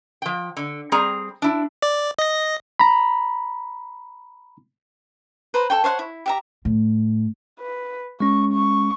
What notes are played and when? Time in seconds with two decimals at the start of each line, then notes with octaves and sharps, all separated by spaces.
0.22 F3 G5
0.57 D3
0.92 G3 C4 G#4 A#5
1.42 D4 E4
1.82 D5
2.19 D#5 A#6
2.79 A#5 B5
5.54 B4 C5 A#5
5.70 A4 C#5 G5
5.84 C5 C#5 F5 F#5
5.99 E4
6.26 G4 E5 A#5
6.65 A2
7.59 B4
8.20 G#3 C#4 C#6
8.53 C#6